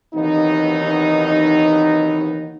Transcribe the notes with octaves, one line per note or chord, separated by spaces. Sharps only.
D#2 C3 E3 F#3 B3 D#4